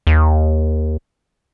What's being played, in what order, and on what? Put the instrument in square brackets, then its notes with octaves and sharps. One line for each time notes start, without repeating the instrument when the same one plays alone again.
[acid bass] D#2